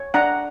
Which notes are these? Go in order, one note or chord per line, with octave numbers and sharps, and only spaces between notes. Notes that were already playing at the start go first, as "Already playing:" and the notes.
Already playing: C#5
D4 F#5 A#5